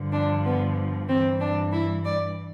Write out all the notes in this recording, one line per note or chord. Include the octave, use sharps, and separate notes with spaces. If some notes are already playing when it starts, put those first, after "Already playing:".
Already playing: G2 D3 F3
D4
B3
G2 E3 C4
D4
E4
D5